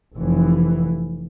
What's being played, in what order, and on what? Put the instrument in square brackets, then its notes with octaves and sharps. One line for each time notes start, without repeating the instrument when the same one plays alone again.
[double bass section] F1 E3